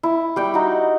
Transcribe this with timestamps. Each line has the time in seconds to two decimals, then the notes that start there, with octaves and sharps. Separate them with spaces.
0.03 E4
0.36 G3 G5 C#6
0.54 D#4 F#4